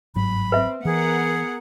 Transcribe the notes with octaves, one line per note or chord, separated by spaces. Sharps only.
G1 G#2 F#3 B5
C4 B4 E5
E3 B3 G#4 A#4 F#5